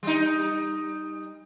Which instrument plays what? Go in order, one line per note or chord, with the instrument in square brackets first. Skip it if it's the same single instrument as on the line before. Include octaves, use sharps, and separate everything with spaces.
[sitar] G3 D#4